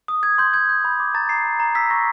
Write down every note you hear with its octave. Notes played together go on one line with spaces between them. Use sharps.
D#6
D#6 G#6
C6 G6
G6 G#6
G6
B5
D6
A#5 A6
A#5 C7
A#5
A#5
E6 B6
C#6 A#6